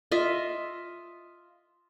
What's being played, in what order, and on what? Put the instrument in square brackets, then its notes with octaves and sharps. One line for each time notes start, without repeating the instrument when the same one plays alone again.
[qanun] F4 D#5 E5